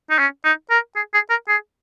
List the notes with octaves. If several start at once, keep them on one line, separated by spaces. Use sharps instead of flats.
D#4
C#4
D#4
A#4
G#4
G#4
A#4
G#4